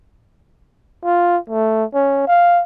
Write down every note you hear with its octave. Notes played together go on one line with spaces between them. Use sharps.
F4
A3
C#4
F5